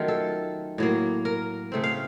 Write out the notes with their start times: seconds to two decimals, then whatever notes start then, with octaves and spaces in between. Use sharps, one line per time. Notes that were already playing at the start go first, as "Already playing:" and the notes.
Already playing: D#3 F#3 A3 C#4 F4
0.08 A4
0.78 A2 F#3 A#3
1.25 A#4
1.72 C#3 A3 C4
1.84 F5